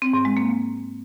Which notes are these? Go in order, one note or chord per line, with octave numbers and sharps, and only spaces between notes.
C4
G#2
G#3
A#3